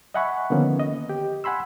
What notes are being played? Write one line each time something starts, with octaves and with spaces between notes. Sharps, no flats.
D#5 E5 F#5 G#5 B5 C#6
D3 D#3 F3 A#3 B3 C#4
D#5
G4 G5
F#5 G#5 B5 C6 E6